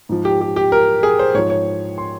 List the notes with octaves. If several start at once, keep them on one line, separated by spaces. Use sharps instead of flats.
G#2 F3
G4
G4
G4
A#4
G#4
C5
G#2 F3 C#5
C#5
C6